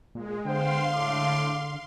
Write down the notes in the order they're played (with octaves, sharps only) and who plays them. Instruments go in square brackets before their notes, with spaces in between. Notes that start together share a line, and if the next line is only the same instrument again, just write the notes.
[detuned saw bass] A#2 [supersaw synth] G#3
[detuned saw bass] D3 [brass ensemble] B3 C5 [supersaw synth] F5 C6 [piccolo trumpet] G5
[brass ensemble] A2 [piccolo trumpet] D6